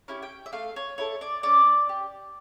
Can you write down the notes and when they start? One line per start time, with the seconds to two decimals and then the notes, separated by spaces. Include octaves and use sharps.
0.08 C#4 E4 G4
0.22 G5
0.46 E5
0.53 A3 F5
0.76 C#5
0.98 E4 A4 C#5
1.21 D5
1.43 C#4 D5
1.89 G4